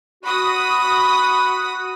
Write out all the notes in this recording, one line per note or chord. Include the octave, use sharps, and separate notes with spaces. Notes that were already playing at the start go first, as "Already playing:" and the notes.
F#4 B5 D#6